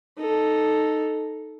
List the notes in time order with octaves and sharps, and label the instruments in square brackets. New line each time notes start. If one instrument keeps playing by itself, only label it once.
[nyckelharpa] D#4 A4